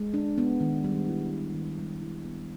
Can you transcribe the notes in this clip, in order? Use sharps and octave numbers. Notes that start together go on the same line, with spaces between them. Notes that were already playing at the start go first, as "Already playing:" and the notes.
Already playing: G#3
D4
B3
D#3
G3
E4
B3
D#3
G3
E4
B3